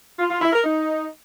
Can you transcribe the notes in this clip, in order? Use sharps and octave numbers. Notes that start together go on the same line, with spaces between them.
F4
F4
E4
A#4
D#4